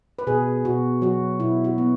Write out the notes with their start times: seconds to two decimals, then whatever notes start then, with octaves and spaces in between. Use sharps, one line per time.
0.19 B4
0.27 B2 G#4
0.65 B2 F#4
1.02 F#3 F#4
1.40 B2 E4
1.64 F#4
1.78 B3